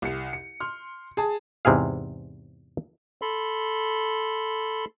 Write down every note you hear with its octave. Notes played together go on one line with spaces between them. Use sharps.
C2 C#7
C#7
C6 F6
G#4 A5
E2 G#2 C3 E4 G#4 F5
A4 B5 C6